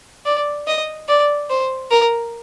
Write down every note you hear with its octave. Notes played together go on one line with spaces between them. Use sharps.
D5
D#5
D5
C5
A#4